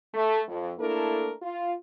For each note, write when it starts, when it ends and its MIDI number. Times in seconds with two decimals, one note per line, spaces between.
0.14 0.39 57
0.48 0.71 41
0.79 1.31 57
0.79 1.31 58
0.79 1.31 62
0.79 1.31 64
0.79 1.31 69
0.79 1.31 70
1.42 1.73 65